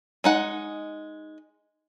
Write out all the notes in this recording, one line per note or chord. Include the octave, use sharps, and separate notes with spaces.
G#3 D#4 F#5